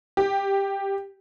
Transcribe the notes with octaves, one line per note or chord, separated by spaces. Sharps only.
G4